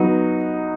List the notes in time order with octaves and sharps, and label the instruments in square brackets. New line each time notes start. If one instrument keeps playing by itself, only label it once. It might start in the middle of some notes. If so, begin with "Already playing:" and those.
Already playing: [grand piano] F#3 B3 D#4 F#4